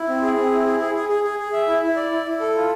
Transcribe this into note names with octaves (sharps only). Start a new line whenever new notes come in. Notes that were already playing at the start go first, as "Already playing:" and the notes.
Already playing: E4
C4
G#4
C4
E4
G#4
G#4
G#4
G#4
G#4
G#4
E5
E4
E4
D5
E4
E4
A4
F4